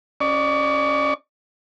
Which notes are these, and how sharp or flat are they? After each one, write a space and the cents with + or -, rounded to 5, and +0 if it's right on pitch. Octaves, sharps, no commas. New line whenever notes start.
C#4 +0 D5 +35 C#6 +40